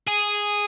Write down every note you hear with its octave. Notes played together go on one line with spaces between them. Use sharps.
G#4